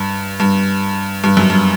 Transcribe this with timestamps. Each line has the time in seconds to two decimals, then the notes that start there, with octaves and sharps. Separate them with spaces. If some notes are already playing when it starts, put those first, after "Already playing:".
Already playing: G2
0.40 G2
1.24 G2
1.37 F#2
1.50 G2